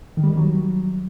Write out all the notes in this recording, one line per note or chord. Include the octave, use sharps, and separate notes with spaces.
D#3
G3
D#3
F#3